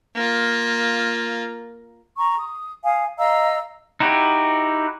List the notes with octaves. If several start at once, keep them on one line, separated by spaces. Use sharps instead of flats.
A#3 F4
A#5 C#6
D#6
F5 G#5 D#6
D#5 F5 A#5 E6
D#4 E4 F#4 G4